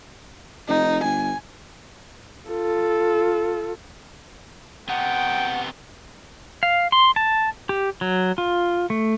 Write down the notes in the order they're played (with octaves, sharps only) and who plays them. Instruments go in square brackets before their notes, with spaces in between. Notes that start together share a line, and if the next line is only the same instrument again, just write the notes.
[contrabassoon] F1 [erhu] D#4
[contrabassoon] G1 [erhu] G#5
[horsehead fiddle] F4 A4
[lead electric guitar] C3 B3 [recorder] F#5 [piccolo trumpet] G5
[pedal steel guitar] F5
C6
A5
G4
F#3
F4
A3